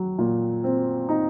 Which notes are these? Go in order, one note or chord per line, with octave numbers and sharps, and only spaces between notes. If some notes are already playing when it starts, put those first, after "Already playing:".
Already playing: F#3
A#2
C4
D#4